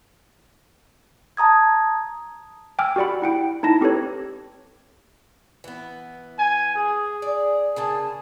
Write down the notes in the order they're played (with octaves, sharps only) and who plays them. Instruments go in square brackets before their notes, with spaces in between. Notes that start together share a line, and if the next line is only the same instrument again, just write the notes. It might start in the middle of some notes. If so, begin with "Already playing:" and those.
[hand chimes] A5 A#5 D#6 G#6
[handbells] G5 G#5 D6 E6 F6
F#4 G4 D5 F#5 B5
E4 F#5 G5
D#4 E4 A5 A#6
C4 G4 A4 B4 C#5
[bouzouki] E3 B3
[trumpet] G#5
G#4
[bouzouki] D5
[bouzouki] C#3 A#3 A5 [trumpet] G#4